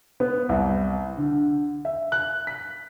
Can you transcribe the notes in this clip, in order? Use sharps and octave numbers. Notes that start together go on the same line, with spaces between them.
B3
C2
D3
E5
F#6
B6